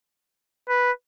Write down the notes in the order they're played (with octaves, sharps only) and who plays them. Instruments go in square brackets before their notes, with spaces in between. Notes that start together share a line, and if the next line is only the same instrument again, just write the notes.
[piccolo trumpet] B4